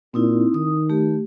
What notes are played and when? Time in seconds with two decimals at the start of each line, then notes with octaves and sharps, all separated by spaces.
0.14 A#2 C4 D#4 E4
0.54 D#3 D#6
0.90 A3 G4